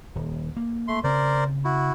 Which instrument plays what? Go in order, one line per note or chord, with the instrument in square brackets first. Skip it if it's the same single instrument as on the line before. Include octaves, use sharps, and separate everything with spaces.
[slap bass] D#1
A#3
[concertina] A3 C6
[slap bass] C#3 C4 [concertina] A#4 C5 D5
[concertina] E4 F#4